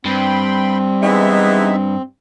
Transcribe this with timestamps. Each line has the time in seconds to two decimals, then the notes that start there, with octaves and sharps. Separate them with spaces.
0.05 G2 C4 G5 B5 C6
1.02 E3 G#3 B3 D#4 E5